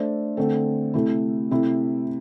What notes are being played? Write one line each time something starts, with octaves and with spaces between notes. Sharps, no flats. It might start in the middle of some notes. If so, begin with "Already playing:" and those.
Already playing: A3 D4 C5 E5
D3 A3 C4 A4
C3 A3 E4
C3 A3 E4